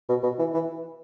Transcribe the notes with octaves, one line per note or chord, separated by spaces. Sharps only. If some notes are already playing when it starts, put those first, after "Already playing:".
B2
B2
E3
E3